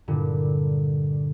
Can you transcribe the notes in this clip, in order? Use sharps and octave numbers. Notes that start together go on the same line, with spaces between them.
G2 A#2 D3